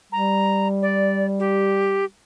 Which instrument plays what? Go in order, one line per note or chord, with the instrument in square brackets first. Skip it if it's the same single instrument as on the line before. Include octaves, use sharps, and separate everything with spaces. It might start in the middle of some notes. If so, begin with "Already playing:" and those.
[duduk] G3 [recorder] A#5
[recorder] D5
G4